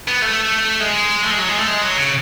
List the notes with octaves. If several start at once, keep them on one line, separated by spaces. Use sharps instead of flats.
B3
A3
G#3
A3
G#3
F#3
G#3
A3
G#3
F#3
C#3